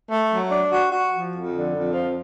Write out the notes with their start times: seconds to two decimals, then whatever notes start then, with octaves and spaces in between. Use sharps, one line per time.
0.11 A3
0.31 F#3
0.51 D4
0.72 F#4
0.92 F#4
1.13 F3
1.33 F2
1.53 D3
1.73 F2
1.93 F3